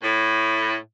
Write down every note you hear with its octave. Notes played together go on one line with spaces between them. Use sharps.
A2